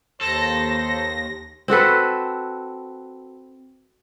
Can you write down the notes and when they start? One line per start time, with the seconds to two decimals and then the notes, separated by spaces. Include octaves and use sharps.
0.21 D#2 A4 C5 A#6
1.68 C4 F#4 A4 B4